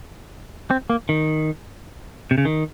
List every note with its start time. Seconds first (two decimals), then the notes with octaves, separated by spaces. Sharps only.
0.71 C4
0.90 A#3
1.09 D#3
2.31 C3
2.38 C#3
2.45 D#3